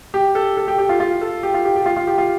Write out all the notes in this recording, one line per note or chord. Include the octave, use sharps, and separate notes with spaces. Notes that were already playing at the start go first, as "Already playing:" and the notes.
G4
A4
A4
G4
G4
F4
F4
A4
G4
F4
G4
G4
F4
F4
G4
F4